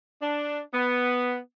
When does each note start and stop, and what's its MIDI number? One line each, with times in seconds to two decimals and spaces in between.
0.22 0.60 62
0.73 1.36 59